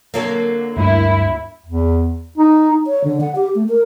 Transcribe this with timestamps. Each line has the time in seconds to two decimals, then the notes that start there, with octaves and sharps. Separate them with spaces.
0.14 D3 F#3 A#3
0.77 D2 G2 E4
1.66 E2
2.38 D#4
2.87 C#5
3.04 D3
3.21 F#5
3.35 G4
3.55 A3
3.69 A#4